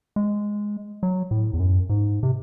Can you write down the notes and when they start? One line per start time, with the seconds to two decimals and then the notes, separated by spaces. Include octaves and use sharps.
0.16 G#3
1.03 F#3
1.31 A2
1.54 E2
1.60 F#2
1.90 G#2
2.23 C3